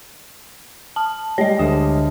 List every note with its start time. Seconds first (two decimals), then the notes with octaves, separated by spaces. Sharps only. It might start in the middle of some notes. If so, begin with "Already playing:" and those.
0.96 A5 F6
1.38 G3 G#3 G4 C#5 D#5
1.59 D2 D#6 E7